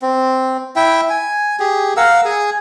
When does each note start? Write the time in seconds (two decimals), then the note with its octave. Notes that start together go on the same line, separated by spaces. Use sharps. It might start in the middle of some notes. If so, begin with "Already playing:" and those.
0.02 C4
0.76 E4 E5 G5
1.10 G#5
1.60 G4 G#4
1.97 A#4 F5 F#5 E6
2.25 G#4 G#5